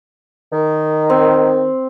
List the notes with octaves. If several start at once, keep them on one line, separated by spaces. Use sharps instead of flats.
D#3
C4